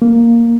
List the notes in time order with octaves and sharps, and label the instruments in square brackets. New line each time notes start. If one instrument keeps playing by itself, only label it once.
[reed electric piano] A#3